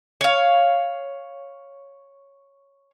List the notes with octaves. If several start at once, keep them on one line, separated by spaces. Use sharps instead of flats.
C#5 F5